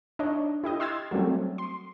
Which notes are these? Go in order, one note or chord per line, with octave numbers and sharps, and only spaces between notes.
D4 D#4 C#5 D#5
E4 G4 D#5
C6 E6 F6 G#6 A6
F#3 G3 A3 C4
C6